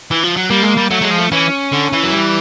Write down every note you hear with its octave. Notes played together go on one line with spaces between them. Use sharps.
E3
F3
F#3
G3 A#3
G#3
G3
F#3 A3
F#3 G#3
F3
A3
E3 C#4
D3
E3
F#3
G3